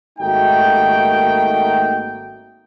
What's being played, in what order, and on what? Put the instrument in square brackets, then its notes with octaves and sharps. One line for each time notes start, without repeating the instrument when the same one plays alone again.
[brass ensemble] G#1 A3 A#3 D#4 F#4 G5